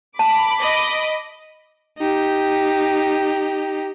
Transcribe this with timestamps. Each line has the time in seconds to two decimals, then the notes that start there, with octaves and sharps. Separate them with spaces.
0.19 A5 B5 D6
0.59 D#5
1.98 D#4 G4